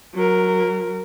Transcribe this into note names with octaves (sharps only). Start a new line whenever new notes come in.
F#3 A#4